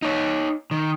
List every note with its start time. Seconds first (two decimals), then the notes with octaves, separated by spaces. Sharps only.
0.02 D#4 C#5
0.71 D#3